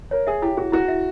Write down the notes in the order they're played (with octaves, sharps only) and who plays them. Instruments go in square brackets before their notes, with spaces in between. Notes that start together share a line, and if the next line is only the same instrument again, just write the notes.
[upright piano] A#4 [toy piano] C#5
[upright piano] G#4 [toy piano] E5
[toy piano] E4 [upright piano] G4
[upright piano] F#4 [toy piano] G#4
[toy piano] E4 [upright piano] F#4
[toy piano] E5